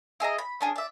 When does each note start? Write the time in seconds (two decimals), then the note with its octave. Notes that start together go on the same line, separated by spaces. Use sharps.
0.20 E4 G#4 D#5 A#5
0.38 B5
0.61 C#4 D4 G#4
0.76 D5 E5